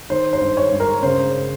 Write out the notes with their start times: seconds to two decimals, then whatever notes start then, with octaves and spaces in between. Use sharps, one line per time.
0.10 D#3 C5
0.33 C5
0.42 G2
0.57 C#5
0.72 G2
0.80 A#4
1.03 C#3 C5